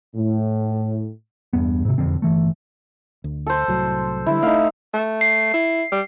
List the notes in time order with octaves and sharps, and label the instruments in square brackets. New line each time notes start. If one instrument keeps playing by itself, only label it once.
[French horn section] A2
[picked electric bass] E2 G2 B3
G#2 C3
E1 F2 D3 C4
G1 E3 A3
[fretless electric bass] D2
[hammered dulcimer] A4 C5
[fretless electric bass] C2 A2 F#3
[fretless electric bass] D3 G3 [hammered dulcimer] E4
[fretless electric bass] A3 [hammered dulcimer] D#4 F5
[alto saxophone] A3
[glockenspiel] C7
[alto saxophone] E4
G3